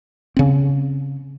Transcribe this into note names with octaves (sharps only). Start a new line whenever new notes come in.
C#3 C4